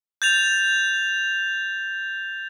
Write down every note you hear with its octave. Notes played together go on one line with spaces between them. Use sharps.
G6 A6 F7